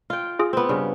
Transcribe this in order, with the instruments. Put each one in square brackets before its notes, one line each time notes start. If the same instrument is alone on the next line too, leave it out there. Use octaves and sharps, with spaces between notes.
[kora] F4 G5
[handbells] F4 G#4
[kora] B3 C4
G2 C#3